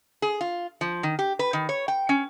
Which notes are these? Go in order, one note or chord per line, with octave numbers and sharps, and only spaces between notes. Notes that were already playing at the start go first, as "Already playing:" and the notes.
G#4
F4
F3
D#3
G4
B4
D#3
C#5
G5
C#4